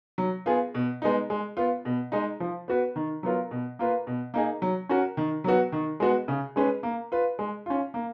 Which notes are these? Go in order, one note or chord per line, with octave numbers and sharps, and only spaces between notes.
F#3
B3 F4 G#4
B2
G#3 B3 D#4
G#3
B3 F4
B2
G#3 D#4
F3
B3 F#4 B4
D#3
F#3 B3 F4 A#4
B2
A#3 F4 B4
B2
A#3 D#4 G#4
F#3
C#4 F#4 A#4
D#3
F#3 B3 F#4
D#3
G#3 B3 F#4
C#3
G#3 C#4 G#4 B4
A#3
F4 B4
G#3
C#4 F4
A#3